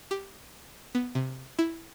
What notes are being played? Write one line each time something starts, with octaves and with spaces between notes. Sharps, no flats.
G4
B3
C3
E4